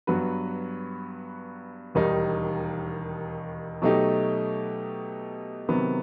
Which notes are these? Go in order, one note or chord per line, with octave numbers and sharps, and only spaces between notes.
G2 F#3 B3 F#4 B4
E1 D#2 D#3 G3 D#4
B2 F#3 A3 D#4 G4
C3 D#3 F#3 B3